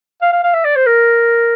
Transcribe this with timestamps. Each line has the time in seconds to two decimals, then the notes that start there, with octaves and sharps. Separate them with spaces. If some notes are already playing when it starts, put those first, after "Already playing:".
0.21 F5
0.33 F5
0.43 F5
0.54 E5
0.65 D5
0.76 C5
0.86 A#4